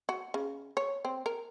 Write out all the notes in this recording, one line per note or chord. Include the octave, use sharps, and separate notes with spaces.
F#4
C#3
C#5
C4
A#4